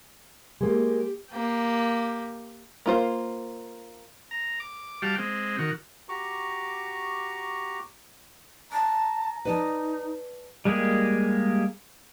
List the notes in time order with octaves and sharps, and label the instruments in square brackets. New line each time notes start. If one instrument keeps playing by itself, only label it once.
[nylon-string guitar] G#3 A#3 [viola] G4
[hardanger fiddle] A#3 G4
[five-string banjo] A#3 F4 C5
[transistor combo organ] A#5
D6
G3 F#4 F5 G5 A5 D6
G#3 C4
D#3 F#4
[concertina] F#4 G4 A#5 C#6 D6
[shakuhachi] A5 [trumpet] A#5
[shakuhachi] D#4 [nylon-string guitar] B4 D5 A5
[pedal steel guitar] G3 G#3 A#3 G4 G#4